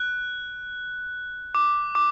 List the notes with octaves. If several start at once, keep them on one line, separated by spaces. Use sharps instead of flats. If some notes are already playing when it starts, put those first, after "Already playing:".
Already playing: F#6
D6
D6